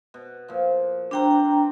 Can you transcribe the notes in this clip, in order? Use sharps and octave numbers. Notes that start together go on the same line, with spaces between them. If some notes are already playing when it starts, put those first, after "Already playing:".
B2
A#2 F3
G3 C4 D4 F#4 G5 A#5